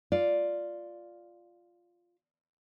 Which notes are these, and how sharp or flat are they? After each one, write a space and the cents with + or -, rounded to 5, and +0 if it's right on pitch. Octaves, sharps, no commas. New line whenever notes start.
F4 +0 D5 +0